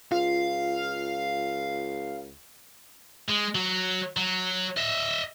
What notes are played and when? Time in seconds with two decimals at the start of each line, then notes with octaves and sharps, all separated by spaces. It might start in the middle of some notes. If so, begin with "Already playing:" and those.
0.12 C#2 F4 F5
3.28 G#3
3.55 F#3
4.17 F#3
4.77 D#5 E5